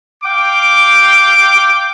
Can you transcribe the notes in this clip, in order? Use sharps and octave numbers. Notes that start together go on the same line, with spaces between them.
F5 G5 D6